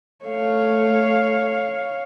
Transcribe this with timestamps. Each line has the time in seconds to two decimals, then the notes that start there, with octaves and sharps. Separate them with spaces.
0.25 A3 C#5 F5